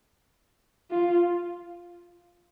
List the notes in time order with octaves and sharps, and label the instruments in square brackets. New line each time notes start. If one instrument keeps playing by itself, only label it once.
[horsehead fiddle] F4